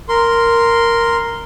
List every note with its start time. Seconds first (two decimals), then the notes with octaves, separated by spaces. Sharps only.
0.09 A#4 C6